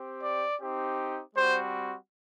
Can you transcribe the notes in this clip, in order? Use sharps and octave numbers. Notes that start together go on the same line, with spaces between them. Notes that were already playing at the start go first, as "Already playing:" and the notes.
Already playing: C4 G4
D5
C4 D#4 G4
G3 C4 F#4 C5